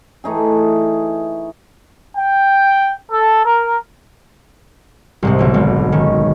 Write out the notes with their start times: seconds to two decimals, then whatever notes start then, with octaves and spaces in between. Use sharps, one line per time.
0.24 E3 A3 D#4 G#4
2.16 G5
3.11 A4
3.44 A#4
5.23 C2 G#2 C3
5.39 B1 D3
5.54 G#1
5.92 D#3 C#4